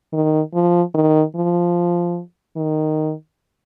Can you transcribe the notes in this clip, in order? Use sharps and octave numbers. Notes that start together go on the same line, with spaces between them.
D#3
F3
D#3
F3
D#3